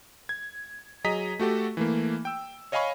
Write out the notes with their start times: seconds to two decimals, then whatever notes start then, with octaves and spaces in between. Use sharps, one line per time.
0.29 G#6
1.04 F#3 G#4 D#5 A#5 D#6 B6
1.39 A3 F#4 G4 A4
1.77 E3 A3 A#3
2.25 G5 E6
2.72 C#5 D#5 F5 G#5 B5 C#6